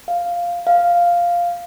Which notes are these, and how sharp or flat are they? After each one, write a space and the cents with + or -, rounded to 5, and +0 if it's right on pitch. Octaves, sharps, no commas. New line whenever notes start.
F5 +0
F5 +0